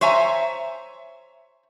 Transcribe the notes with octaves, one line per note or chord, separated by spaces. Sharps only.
C5 C#5 E5 G#5 A#5